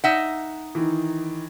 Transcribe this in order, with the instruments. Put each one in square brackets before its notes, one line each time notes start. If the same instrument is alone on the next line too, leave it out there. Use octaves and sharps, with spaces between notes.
[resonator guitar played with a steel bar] D#4 E5 F#5
[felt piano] D#3 E3